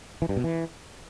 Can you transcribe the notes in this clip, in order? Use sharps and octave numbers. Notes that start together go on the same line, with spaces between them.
E3
G2
B2
E3